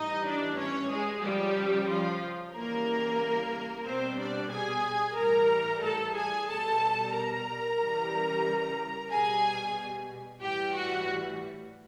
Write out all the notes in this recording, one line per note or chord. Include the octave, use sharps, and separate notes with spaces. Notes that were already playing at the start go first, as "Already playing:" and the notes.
Already playing: A2 E3 G3 D#4 D#5
D4 D5
C#4 C#5
G#3 G#4
C#3 F3 G3 G4
F3 F4
C#3 E3 G3 A#3 A#4
B2 G3 C4 C5
D4 D5
G#4 G#5
A2 E3 G3 A#4 A#5
A4 A5
G#4 G#5
B2 G3 A4 A5
A#4 A#5
C#3 E3 G3
B2 G3 G#4 G#5
A2 E3 G3 G4 G5
F#4 F#5